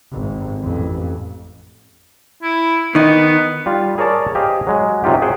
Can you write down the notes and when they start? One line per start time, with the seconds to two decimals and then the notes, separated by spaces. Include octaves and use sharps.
0.12 G#1
0.62 A1 F2
2.42 E4
2.95 D#3 B3 D#4
3.66 G3 F4
3.98 G#4 A#4 C#5 D5 A5
4.35 G4 G#4 C5 D#5 F5
4.67 F#3 G#3
5.04 C3 F#3 D#4 F4 G4
5.22 G#4 C5 F#5 G5